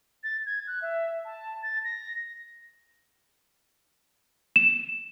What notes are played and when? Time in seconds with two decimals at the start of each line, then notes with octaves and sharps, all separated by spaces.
0.24 A6
0.46 G#6
0.67 F#6
0.82 E5
1.25 A5
1.63 A6
1.84 A#6
4.56 E7